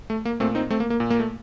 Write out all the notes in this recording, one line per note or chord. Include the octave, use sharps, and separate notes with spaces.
A3
A#3
A#2 A3 C4
C4 D#4
A3 C4
A#3
A#3
A#2
A#3
A3